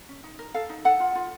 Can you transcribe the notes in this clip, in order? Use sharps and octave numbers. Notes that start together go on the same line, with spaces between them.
C#4
D#4
A#4
A4 F5
D#4
A4 F#5
F4
F4